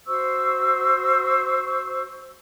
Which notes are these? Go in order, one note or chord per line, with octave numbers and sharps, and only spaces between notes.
F#4 C5 C#6 E6